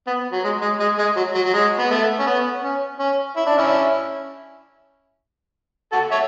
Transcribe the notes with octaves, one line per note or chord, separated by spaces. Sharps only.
B3
F#3
G#3
G#3
G#3
G#3
F#3
F#3
F#3
G#3
B3
A3
C#4
B3
C#4
C#4
E4
D4
C#4 E4
F#4 A4
C#5 E5